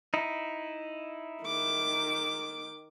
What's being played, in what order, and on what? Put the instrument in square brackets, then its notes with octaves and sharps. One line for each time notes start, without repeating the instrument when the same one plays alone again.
[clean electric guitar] D#4 E4
[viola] D#3 D6